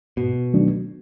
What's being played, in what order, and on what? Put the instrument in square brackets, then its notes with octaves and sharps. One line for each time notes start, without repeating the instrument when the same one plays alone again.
[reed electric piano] G#2 [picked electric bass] B2
[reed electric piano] D#3 F#3 A3 D4